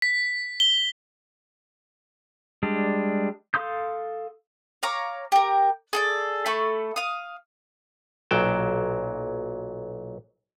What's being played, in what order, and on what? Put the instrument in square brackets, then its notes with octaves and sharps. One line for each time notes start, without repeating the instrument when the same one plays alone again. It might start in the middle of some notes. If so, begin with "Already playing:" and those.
[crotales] B6
G7
[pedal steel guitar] G3 G#3 D4
A4 F5 C6 D#6 G6
[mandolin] C#5 F5 A#5 D6
G4 A#4
G#4 A4 D5
A3 A4 B5 C#6
F5 D#6
[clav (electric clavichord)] B1 A#2 F#3 G5 A5